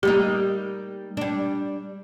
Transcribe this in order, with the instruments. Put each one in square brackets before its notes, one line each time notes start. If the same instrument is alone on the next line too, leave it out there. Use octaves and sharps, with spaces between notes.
[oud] G3 A#3 D#4 [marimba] G4
[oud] G3 D4